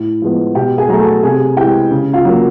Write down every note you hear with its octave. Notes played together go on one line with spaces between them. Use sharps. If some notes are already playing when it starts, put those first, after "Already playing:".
Already playing: A2
F3 G#3 B3
B2 G4 G5
G#4 G#5
F#3 A3 A#5
A4 A5
C3 G#4 G#5
E3 G#3 G4 G5
C#3
F4 F5
F#3 A#3